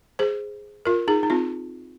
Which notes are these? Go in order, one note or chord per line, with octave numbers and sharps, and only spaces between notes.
G#4 C5
F4 A#4
D#4 G#4
D#4
C4 F4